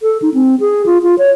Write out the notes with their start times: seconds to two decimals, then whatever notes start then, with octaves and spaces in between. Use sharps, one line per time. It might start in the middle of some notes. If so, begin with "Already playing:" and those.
0.02 A4
0.22 D#4
0.34 C4
0.60 G#4
0.86 F4
1.03 F4
1.18 C#5